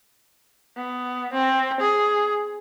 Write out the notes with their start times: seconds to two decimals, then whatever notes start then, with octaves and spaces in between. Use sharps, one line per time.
0.77 B3
1.33 C4
1.81 G#4